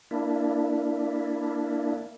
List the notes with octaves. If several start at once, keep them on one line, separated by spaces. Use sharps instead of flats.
A#3 D4 E4